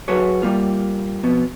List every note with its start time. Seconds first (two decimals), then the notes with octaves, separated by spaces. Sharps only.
0.08 F#3 F#4 G#4 A4 B4 C#5
0.42 G3 A#3 F4
1.23 F2 B2 B3